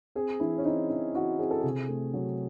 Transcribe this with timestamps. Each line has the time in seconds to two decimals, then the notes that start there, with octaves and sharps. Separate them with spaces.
0.15 C4 G#4
0.40 E3 E4
0.58 C#4
0.65 C4 D#4
0.90 E3 E4
1.14 E3 F#4
1.39 C4 G#4
1.51 A4
1.60 C3 G#4
1.88 A3
2.13 F#3